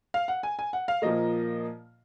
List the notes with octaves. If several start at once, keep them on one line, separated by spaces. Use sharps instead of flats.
F5
F#5
G#5
G#5
F#5
F5
A#2 F3 A#3 D#5